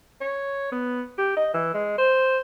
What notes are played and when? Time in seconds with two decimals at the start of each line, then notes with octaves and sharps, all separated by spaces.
0.21 C#5
0.72 B3
1.18 G4
1.37 D#5
1.54 E3
1.74 G#3
1.98 C5